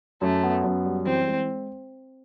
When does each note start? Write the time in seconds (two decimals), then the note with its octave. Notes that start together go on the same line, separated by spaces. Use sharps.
0.21 F#2 A3
0.43 B3
0.64 F#2
0.85 G3
1.06 E3 C4
1.27 G#3